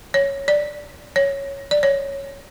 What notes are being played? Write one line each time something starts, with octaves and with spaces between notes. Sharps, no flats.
C#5
D5
C#5
D5
C#5